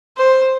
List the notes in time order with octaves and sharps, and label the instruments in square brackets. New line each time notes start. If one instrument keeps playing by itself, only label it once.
[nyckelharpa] C5